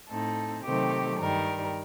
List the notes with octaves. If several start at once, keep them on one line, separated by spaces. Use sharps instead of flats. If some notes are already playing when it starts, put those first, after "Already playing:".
A2 A3 C4 D#4 A4
C3 D#3 F#3 A3 C4 G4
G2 D#3 G3 A#4